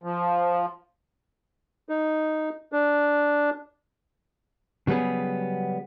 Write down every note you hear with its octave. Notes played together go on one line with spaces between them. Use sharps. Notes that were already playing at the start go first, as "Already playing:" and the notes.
F3
D#4
D4
C#3 F#3 G3 B3 G#4